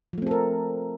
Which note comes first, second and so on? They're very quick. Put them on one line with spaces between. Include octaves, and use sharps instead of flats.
F3 A3 C4 A4 A#4